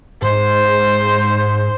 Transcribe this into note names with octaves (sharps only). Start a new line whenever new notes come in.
G#2 C5